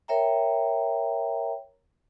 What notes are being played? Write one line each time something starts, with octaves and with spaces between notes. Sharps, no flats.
A#4 C#5 E5 G5 A#5